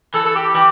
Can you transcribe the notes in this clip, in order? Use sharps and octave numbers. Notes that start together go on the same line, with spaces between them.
E3 A4
A4
G4
E3 G4